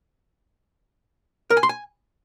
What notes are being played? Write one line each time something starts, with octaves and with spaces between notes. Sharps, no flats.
A#4
G#5
C6
G#5